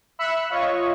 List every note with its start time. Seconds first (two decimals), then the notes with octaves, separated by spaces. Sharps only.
0.19 E5 B5 E6 F#6 C#7
0.50 F4 C#5 D#5 C#6